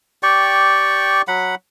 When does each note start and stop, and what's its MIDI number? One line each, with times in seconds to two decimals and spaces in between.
0.23 1.22 67
0.23 1.22 74
0.23 1.22 79
0.23 1.22 85
1.28 1.55 54
1.28 1.55 78
1.28 1.55 83